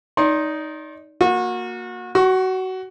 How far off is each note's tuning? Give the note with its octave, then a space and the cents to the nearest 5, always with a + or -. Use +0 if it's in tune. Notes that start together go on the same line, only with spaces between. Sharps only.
D#4 +0 D5 -30 C6 +30
A#3 +0 F#4 -30
F#4 +20 C#6 -20